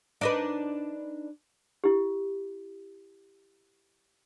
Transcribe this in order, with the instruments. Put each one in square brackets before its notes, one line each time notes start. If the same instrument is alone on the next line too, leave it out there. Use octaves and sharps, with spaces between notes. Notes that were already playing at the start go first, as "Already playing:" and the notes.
[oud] D4 D#4 B4
[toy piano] E4 G4